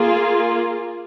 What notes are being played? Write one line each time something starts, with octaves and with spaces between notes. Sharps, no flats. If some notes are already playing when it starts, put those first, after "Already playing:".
Already playing: A#3 F4 G#4